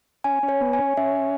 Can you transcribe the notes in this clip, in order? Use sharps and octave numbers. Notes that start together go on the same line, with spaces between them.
C#4 G#5
C#4
C#5
B3
G#5
C#4
C#4 E5